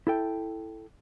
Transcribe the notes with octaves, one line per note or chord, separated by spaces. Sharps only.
E4 A4 G5